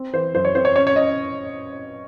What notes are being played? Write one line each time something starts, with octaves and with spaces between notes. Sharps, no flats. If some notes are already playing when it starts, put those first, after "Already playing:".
Already playing: C4
E3 C5
F#2 C5
C#5
C4 C5
C#5
C#4 C#5
C#5
C#4 D#5